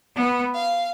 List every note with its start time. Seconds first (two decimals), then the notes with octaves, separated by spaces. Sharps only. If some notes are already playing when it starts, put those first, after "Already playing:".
0.15 B3
0.54 F5